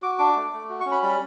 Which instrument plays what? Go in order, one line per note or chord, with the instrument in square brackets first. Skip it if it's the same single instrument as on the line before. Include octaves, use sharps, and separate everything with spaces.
[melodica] F#4 D6
D4 D6
A3
A3
F#4
C#4 C#6
B5
G3 B5